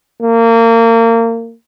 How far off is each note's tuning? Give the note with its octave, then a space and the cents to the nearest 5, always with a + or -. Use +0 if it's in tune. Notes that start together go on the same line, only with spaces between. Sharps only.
A#3 -30